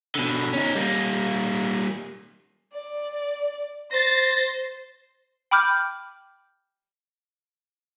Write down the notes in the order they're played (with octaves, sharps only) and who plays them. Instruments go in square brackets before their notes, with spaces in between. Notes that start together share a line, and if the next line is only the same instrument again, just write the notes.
[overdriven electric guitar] B2 D3
C#4 D#4
G3 A#3
[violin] D5
[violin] C5 [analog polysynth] A6 A#6
[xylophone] G5 B5 D6 F6 G6